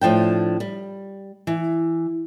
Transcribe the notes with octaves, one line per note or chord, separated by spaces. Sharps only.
A2 F3 D4 G5
G3
E3